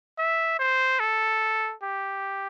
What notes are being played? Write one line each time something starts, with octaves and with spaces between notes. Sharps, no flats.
E5
C5
A4
G4